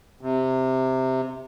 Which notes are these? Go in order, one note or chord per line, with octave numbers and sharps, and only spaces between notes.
C3